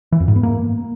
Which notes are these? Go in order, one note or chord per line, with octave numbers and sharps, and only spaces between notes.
E3
F2
G#2
B3
A#3